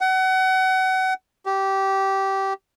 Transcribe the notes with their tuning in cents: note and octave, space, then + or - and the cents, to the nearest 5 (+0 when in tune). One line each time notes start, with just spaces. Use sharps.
F#5 +30
G4 -15